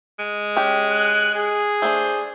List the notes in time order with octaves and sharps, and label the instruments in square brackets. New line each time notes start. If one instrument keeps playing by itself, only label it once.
[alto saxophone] G#3
[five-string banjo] C#4 G4
[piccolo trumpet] F#6
G#4
[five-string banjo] A3 D4 [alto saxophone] C5